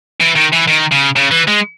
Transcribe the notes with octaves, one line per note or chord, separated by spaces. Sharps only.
E3
D#3
E3
D#3
C#3
C#3
E3
G#3